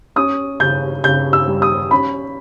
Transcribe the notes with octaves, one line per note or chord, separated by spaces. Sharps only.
C#4 D#6
C#3 G6
C#3 G6
E6
G3
D#6
C#4 B5